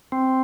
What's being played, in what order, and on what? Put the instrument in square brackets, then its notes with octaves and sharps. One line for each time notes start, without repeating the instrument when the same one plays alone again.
[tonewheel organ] C4